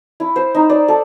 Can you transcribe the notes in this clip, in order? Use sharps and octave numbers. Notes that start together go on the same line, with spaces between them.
E4
C5
D#4
D5
A4